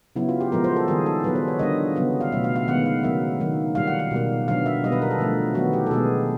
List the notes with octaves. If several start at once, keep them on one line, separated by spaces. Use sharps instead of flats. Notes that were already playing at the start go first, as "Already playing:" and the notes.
C#3 F#3 B3 E4
F4
G4
A#2 F3 G#3 B3 A#4
C5
A4
D#3 G3 A#3 G#4
A4
A#2 F#3 B3 B4
C5
C#5
D3 G3 A#3 D#5
C#3 F#3 B3
F5
B2 F#3 A3 E5
F5
F5
D#3 G#3 B3 F#5
F5
C#3 F#3 A#3 E5
D#3 F#3 A#3
A#2 G3 A#3 F5
F#5
F5
B2 G3 A#3
D3 F#3 B3 F5
E5
B2 G3 B3 D#5
B4
A#4
A4
D3 F3 A3
D#3 F#3 B3 F#4
G4
A4
B2 G#3 B3 G#4